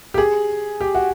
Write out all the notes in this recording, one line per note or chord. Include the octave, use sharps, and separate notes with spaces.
G4
G#4
G4
F#4